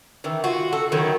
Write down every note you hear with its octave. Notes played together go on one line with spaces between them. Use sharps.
D#3 E3
F4 F#4
F#4 A4
D#3 F#3 E4 F#4